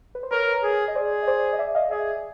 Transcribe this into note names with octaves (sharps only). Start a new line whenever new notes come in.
B4
C5
A#4 B4 C#5
G#4
D#5
G#4 C5 D5
D#5
C5 D5
D#5
D5 E5
D#5 F5
G#4 D5 E5